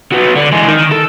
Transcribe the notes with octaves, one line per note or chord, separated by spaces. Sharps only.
F#3 B3
D3
E3 G#3
D#3
A4